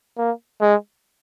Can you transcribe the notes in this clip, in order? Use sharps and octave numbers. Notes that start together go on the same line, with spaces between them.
A#3
G#3